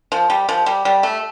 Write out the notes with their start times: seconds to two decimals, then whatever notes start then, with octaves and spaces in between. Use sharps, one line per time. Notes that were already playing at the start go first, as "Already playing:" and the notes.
0.12 F3
0.30 G3
0.49 F3
0.66 G3
0.85 G3
1.03 A3